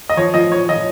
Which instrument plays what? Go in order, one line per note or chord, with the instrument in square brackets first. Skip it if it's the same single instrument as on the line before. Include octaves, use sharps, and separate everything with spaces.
[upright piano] D#5
F3 C#5
F3 D#5
F3 C#5
F3 D#5